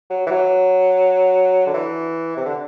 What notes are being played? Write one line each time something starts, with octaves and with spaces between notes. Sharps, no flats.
F#3
E3
F#3
D3
E3
C3
D3